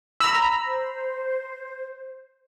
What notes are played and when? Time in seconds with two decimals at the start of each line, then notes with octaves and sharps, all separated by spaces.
0.20 A#5 B5 E6
0.65 C5